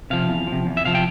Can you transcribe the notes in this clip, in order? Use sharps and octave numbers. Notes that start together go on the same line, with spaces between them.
C3 F3 F5
E2
F3
C3
E2
E5
C3 F3 F5
G5